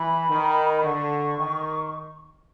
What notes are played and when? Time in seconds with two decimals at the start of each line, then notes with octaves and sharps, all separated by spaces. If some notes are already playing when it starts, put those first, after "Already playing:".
Already playing: E3 B5
0.30 D#3
0.83 D3 C#6
1.38 D#3